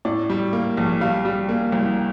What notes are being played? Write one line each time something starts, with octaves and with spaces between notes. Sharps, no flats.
A2 D5
G3
A#3
A#1
G3 F5
G3
A#3
C2